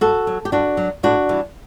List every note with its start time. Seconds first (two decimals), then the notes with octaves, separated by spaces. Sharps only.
0.01 G2 F#4 A4
0.27 F#3
0.45 G4
0.52 G2 D4 F#4
0.77 F#3
1.03 A2 D4 F#4
1.29 E3 G3